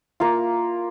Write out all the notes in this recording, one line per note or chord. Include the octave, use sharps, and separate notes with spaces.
A#3 F4